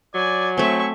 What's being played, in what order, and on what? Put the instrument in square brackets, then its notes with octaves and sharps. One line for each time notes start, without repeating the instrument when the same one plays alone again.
[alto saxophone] F#3 [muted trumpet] D5 [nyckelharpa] G#5
[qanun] A3 C4 [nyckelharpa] E5 C#6 [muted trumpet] G#5